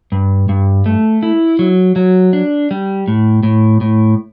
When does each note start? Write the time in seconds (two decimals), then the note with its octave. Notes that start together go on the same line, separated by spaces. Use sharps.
0.12 G2
0.49 G2
0.86 A3
1.23 E4
1.59 F#3
1.96 F#3
2.33 D4
2.71 G3
3.08 A2
3.43 A2
3.81 A2